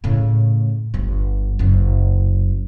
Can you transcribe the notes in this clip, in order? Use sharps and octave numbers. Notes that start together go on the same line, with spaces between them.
A2 C#3
G1 G2
F#1 F#2